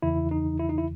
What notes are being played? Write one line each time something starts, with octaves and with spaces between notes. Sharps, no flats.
E2 C#3 E3 E4
D#4
E4
D#4
E4